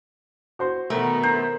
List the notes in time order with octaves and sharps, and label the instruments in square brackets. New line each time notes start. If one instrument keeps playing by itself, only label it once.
[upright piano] F#4 C5 C6
[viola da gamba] B2 D#3 B3 [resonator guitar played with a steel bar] A3 [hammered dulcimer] A#4
[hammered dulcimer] C5 [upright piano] A#5